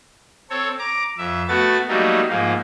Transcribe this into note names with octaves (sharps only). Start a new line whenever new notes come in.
C4 A4 C#5
A#5 D6
F2 E5
A3 B3 F#4 A6
F#3 G3 A3 A#3 D#4
G#2 F3 A#3